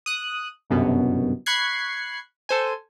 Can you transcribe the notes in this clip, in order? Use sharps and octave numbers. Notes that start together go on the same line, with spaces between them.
D#6 F#6
G1 C2 F#2 B2
B5 C#6 F#6 G#6 C7
A4 C5 G#5